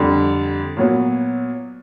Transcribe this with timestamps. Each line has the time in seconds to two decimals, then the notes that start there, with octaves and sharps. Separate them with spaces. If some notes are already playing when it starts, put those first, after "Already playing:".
Already playing: F2 D3 G3
0.77 A#2 F#3 B3